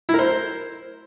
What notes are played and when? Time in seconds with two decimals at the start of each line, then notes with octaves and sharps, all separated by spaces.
0.09 E4
0.14 A#4
0.19 C5